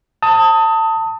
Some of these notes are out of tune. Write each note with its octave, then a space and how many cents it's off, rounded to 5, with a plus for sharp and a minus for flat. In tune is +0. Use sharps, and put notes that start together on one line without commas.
A5 +25 D#6 +20